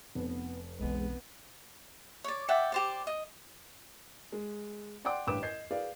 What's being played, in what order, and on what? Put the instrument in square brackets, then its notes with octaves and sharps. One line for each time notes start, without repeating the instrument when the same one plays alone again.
[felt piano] F1 [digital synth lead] B3
[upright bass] B1 E3 [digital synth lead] G#3 [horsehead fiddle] B3
[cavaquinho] C#5 D5
D5 E5 F#5 G5
G4 C5 D5
D#5
[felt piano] G#3
D5 F#5 G5 C6 D6
A1 G2 B4 G5 D6 E7
D#5 G6 G#6 C7
G#4 B4 D5 F5